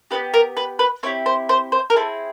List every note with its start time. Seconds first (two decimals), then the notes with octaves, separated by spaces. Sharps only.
0.11 B3 D#4 G4 B4
0.34 A#4
0.57 B4
0.79 B4
1.03 C4 E4 G4 C#5
1.26 C5
1.49 C5
1.72 C5
1.90 A#4
1.95 C4 E4 G#4 A4